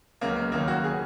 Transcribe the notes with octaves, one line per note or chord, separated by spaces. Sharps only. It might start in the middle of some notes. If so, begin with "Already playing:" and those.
C#2 C#3 F#3 A#3
A#3
D#2 C#3 F#3 A#3
F#4
C#3 F#3 G#4